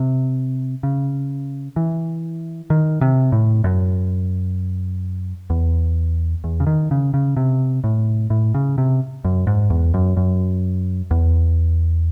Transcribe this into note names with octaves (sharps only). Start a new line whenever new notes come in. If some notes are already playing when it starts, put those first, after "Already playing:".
Already playing: C3
C#3
E3
D#3
C3
A2
F#2
E2
E2
C#3
D#3
C#3
C#3
C3
A2
A2
C#3
C3
F#2
G#2
E2
F#2
F#2
E2